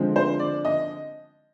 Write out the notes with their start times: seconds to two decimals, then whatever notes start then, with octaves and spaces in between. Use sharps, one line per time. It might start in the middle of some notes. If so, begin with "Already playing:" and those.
Already playing: D3 F3 G#3 C4
0.16 C5
0.39 D5
0.65 D#5